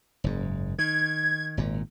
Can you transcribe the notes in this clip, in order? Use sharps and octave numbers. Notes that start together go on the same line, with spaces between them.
F#1 G#2
D#3 G#6
G#1 A#2